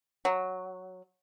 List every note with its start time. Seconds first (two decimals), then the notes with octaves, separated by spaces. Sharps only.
0.25 F#3